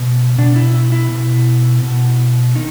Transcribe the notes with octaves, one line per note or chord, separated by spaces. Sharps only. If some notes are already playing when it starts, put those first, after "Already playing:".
Already playing: B2
B2 D4
E4
E4
E4
B2
B2
D#3 D#4